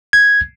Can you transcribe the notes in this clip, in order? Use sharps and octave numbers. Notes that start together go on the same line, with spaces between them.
G#6